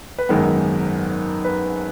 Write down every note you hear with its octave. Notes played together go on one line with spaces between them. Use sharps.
B4
G#1 F#2 D#3 G#3 B3 A#4
B4